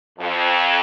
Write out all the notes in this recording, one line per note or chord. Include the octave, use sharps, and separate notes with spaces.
F2